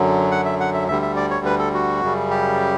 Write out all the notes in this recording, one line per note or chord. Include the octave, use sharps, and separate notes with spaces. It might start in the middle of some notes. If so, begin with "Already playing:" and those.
Already playing: F#2 D3 F#3
F#5
E5
F#5
E5
D2 D3 G3 E5
E5
D5
C#5
B4
A4
F#4
F#2 C#3 G3
G4